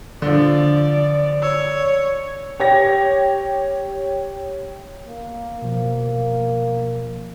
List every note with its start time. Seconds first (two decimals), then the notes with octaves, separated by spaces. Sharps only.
0.22 D3 F3 D5
1.42 C#5 E6
2.60 G4 C#5 A#6
5.08 A#3
5.62 B2 F3